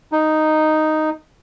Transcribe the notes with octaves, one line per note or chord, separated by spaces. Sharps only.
D#4